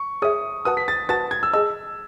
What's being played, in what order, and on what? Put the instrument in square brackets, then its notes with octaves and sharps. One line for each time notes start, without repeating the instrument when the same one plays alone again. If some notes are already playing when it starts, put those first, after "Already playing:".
Already playing: [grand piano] C#6
[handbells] G#4 C#5 E5 [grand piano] D#6
[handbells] F#4 B4 F#5 A5 [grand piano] D#6
[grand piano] B6
A6
[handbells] F#4 B4 F#5 A5 [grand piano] A6
[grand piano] G#6
E6
[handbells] G#4 D#5 A5 [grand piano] E6